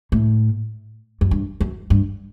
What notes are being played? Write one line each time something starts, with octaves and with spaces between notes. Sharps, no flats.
A2
F#2
G2
F#2
G2